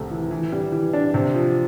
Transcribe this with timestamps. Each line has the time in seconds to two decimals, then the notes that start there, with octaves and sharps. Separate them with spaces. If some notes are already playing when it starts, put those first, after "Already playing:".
Already playing: C2 C3 A3
0.11 E3
0.31 E3
0.52 G3
0.72 E3
0.93 D4
1.14 C3
1.34 F3